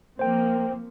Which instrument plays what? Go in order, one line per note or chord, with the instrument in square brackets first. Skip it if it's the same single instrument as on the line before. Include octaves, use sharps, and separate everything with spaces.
[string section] F3 A#3 C4 [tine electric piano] C5 G5